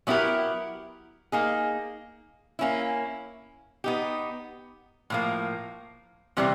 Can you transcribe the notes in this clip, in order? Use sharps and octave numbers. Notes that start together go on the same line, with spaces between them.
F#3 B3 E4 G4 A#4
A#3 D#4 G#4
A#3 C#4 E4
B3 D#4 G4
A2 F3 A#3
C3 E3 G3 C4